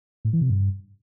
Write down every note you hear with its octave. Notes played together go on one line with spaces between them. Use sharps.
A2
E3
C3
G2